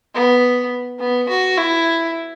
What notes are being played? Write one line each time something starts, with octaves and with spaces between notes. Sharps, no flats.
B3
B3
F#4
E4